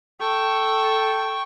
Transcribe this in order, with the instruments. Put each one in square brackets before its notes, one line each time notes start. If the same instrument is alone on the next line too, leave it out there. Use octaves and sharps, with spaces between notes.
[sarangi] A4 [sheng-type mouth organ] G5 C#6